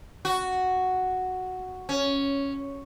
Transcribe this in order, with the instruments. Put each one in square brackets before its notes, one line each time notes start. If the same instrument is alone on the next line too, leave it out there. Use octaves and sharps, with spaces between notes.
[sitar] F#4
C#4